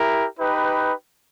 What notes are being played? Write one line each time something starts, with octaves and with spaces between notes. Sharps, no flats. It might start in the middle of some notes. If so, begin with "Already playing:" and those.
Already playing: E4 G4 A#4
D#4 G4 B4